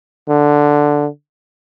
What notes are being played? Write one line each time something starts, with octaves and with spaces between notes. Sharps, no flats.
D3